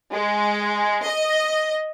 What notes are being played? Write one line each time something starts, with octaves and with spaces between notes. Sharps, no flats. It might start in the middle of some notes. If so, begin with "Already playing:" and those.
G#3
D#5